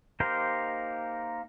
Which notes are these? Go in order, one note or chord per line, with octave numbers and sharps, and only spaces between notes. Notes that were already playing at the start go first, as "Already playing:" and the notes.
A#3 D#4 G4 A#4 C5